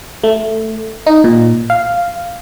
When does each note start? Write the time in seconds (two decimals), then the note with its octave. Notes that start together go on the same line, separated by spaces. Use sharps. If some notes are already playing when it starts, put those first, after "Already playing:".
0.24 A3
1.07 D#4
1.24 A#2
1.70 F5